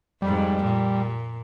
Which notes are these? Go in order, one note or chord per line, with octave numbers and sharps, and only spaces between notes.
F2 G#2 G3
A#2